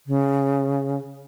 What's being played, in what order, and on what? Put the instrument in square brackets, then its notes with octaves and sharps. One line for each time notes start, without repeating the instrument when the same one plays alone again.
[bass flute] C#3